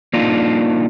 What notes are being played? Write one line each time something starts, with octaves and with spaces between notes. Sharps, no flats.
A#3 D4 D#4 F4